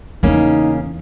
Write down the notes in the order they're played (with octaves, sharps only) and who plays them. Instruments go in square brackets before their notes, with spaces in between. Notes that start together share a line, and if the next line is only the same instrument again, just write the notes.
[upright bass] E2 E3 [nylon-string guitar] C#3 A#3 C#4 [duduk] D#4